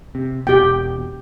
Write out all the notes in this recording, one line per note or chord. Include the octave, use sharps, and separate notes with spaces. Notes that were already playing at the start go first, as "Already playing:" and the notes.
C3
E1 B2 G4 G5